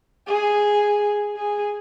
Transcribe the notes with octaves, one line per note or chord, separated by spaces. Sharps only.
G#4
G#4